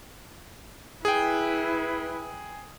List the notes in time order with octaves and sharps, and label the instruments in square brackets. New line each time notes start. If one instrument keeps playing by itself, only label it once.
[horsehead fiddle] E4 B4 [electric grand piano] G#4 G5